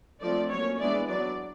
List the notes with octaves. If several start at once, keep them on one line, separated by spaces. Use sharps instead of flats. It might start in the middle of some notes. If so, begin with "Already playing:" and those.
D3 F3 A3 C4 D5
F#3 A#3 C#4 C#5
E3 G#3 B3 D4 D5
F#3 B3 D4 D5